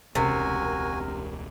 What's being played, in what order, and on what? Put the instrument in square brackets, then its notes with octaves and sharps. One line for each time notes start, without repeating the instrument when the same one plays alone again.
[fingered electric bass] E1 C#2 C#4 [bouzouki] C3 [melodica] F#4 G#5 [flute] A#4